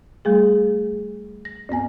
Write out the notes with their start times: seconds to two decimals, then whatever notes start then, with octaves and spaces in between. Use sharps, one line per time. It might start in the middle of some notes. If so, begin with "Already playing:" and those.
0.25 G3 A3 G#4
1.45 A#6
1.69 D2 G2 B3 G#5